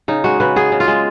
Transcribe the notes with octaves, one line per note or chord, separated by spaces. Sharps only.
C#3 D#4
G#3 F#4
C#3 B4
B3 G#4
C#3
F4
G#3